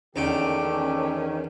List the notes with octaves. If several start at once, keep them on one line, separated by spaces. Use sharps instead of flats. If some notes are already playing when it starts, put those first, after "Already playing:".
E2 D3 D#3 A3 A#3 C#4 G4 G5